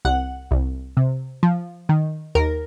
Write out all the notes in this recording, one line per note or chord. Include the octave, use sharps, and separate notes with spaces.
C2 F#5
C2
C3
F3
D#3
D#2 A#4